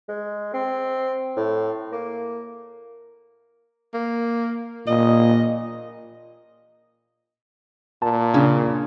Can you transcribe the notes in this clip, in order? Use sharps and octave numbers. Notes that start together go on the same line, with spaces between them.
G#3
C4
A2
A#3
A#3
A#2 D#5
A#2 A5
C#3 D4